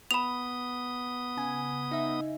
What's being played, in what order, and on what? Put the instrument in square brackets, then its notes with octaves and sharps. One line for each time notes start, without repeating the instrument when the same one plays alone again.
[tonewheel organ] B3 D#6 [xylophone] B5 F7
[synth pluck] C#3 G#5
D#4 E5